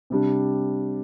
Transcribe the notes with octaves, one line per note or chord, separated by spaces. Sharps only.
C3 G3 D4